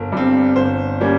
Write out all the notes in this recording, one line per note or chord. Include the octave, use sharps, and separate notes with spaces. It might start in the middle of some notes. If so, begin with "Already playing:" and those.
Already playing: G1 A#4
G2 G3 C4
G1 C5
G3 A#3 C#4